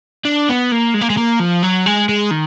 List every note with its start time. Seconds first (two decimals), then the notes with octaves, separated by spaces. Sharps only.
0.25 D4
0.49 B3
0.71 A#3
0.94 G#3
1.01 A#3
1.10 G#3
1.17 A#3
1.40 F3
1.63 F#3
1.86 G#3
2.09 G#3
2.31 D#3